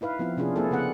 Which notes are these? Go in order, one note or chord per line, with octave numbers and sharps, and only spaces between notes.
D#4 E4 B4 F5
F3 B3 C4 E4
C3 C#4 D4 F4 G#4
A#3 C4 E4 G#4 A4
C#3 B3 F#5